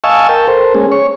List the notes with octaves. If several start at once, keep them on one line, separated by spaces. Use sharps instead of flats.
D#5 F5 G#5 A5 C#6 E6
A#4 G5 A5
A4 A#4 C5
G#3 A#3 C#4 G#4
C#5 C#6